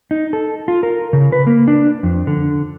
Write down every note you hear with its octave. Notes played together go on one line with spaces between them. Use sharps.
D#4
A4
F4
A#4
C#3
B4
A#3
D4
F2
D3